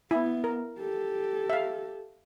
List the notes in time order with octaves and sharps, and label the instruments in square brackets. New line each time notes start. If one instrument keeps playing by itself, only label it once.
[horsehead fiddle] B3 [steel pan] E4
[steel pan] A#4
[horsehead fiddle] G4 A4
[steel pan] E5 F5